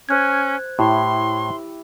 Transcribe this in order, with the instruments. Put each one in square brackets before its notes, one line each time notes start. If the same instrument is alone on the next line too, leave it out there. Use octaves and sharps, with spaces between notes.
[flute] C#4 [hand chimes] C5 F#6 G#6
[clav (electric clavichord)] A2 [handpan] E4 G4 [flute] C6